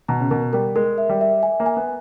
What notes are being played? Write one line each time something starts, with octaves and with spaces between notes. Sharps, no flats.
B2 A#5
C#3
B2 A#4
G3 A#4
G#3 A#4
E5
G3
E5
G#5
A#3
G#5
B3